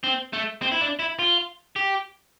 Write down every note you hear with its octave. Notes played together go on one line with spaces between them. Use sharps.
C4
A3
C4
E4
D4
E4
F4
G4